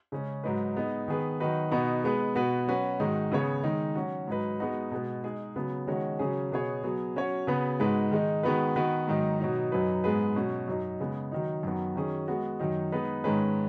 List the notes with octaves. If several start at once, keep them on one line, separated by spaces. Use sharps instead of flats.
C#3 G#3 C#4
G#2 F#3 D#4 B4
G#3 B3 D#4
D#3 B3 G#4 B4
D#3 F#3 D#4 F#4 B4
B2 B3 D#4 F#4
G#3 B3 G#4 B4
B2 B3 F#4 B4
F#3 C#4 F#4 B4
G#2 D#3 G#3 D#4 F#4
C#3 B3 G#4 C#5
D#3 G#3 D#4
F#3 C#4 F#4
G#2 F#3 D#4 B4
G#3 B3 D#4 F#4
B2 G#3 B3
G#3 D#4 G#4
C#3 F#3 B3
D#3 G#3 C#4 F#4 C#5
C#3 F#3 C#4 G#4
B2 B3 G#4 C#5
F#3 B3 G#4
F#3 C#4 F#4 C#5
C#3 B3 F#4 B4
G#2 G#3 D#4 F#4 B4
D#3 G#3 D#4
D#3 G#3 B3 F#4 B4
D#3 B3 F#4 B4
G#2 D#3 F#3 D#4
B2 F#3 D#4
F#2 F#3 D#4 B4
G#2 G#3 B3 G#4 B4
B2 F#3 C#4
F#2 F#3 D#4
C#3 G#3 B3
D#3 F#3 D#4
F#2 D#3 B3 F#4
D#3 F#3 C#4 G#4
G#3 B3 F#4
F#2 D#3 F#3 D#4
G#3 B3 D#4 B4
G#2 D#3 G#3 C#4 B4